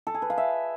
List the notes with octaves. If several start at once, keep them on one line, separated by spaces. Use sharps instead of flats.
A4
G#4
B4
F5
E5